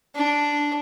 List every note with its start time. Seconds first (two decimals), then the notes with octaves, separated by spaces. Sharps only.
0.16 D4